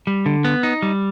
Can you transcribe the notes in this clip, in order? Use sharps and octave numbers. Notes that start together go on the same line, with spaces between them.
G3
D3
B3
D#4
G3